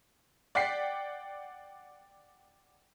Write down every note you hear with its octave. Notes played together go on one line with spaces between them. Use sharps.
D5 F#5 G5 B6 C7